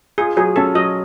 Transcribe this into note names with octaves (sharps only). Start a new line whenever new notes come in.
F4 G#4
F#3 G#4
C#4 A4
F#3 D#5